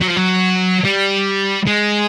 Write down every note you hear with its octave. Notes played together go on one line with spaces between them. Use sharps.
F#3
F3
F#3
G3
G#3